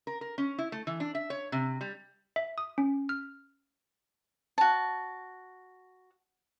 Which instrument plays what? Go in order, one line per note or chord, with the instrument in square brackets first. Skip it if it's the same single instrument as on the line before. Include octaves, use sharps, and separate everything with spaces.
[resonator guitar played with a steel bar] A#4
A#4
C#4
E4
A3
E3
D4
E5
C#5
C3
G3
[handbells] E5
D#6
C#4
F6
[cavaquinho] F#4 A5